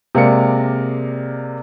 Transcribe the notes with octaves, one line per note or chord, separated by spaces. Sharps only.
C3 G#3 A#3 A#4 D5 C#7